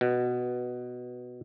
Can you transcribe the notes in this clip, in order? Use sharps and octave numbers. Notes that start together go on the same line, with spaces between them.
B2